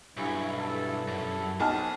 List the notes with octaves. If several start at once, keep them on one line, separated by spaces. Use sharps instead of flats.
B1 G2 E4 G#5 C#6
E4 A4
F#2
B1 C4 G#4 A5 F6